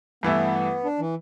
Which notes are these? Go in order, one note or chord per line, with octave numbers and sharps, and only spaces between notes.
G2 E3 A3 B3 E4
D4
E3